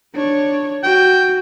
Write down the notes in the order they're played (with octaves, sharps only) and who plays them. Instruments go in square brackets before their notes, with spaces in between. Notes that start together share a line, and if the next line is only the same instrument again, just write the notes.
[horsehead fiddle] D4 C#5
[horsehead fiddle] F#4 [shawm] G5